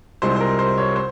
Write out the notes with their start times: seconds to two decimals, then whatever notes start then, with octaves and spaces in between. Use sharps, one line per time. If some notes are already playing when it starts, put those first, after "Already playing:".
0.22 C2 C3 F3 G#3 C5
0.36 C5
0.40 A#4
0.59 C5
0.78 C#5
0.96 C5